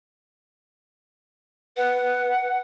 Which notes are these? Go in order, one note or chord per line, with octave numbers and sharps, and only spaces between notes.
B4 F#5